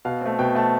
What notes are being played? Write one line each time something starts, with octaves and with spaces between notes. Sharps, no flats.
B2 F5
A3 C4
B2 G5
A3 C4 A5